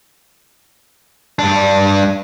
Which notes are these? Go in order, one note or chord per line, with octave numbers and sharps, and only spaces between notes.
G2 D4